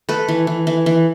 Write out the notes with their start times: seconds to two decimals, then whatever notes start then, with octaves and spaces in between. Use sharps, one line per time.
0.09 A3 A4 B4
0.28 E3
0.47 E3
0.67 E3
0.86 E3